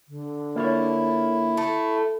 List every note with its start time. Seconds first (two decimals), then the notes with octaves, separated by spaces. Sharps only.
0.08 D3
0.56 A#3 E4 F4 C#5
1.57 A3